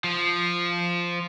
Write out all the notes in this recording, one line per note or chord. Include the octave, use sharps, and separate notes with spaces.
F3